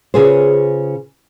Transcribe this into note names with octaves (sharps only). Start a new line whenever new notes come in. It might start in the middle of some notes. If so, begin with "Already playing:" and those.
C#3 C#4 F4 G#4 B4 C5